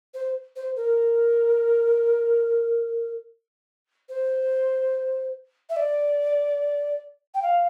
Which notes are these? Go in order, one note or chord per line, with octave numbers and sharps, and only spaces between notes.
C5
C5
A#4
C5
E5
D5
G5
F5